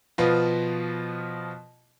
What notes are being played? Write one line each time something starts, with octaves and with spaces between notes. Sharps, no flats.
B2 F3 B3 F4